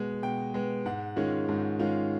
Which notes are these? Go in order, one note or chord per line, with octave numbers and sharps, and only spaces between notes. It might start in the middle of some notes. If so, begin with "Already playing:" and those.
Already playing: B2 G#3 B3
B2 G5
G#3 B3
G#2 F#5
D#3 G#3 C#4 F4
G#2
D#3 G#3 C#4 F4